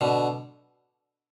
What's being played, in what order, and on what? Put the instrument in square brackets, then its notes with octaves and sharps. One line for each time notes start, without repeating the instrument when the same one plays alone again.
[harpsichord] B2 D3